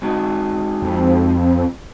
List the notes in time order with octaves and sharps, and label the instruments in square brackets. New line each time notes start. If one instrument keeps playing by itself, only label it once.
[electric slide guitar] G#3 D#4 F#4
[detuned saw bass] F2